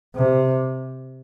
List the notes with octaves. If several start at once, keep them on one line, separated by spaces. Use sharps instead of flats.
C3